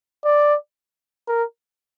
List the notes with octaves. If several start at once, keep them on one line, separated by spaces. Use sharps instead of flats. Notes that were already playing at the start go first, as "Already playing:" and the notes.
D5
A#4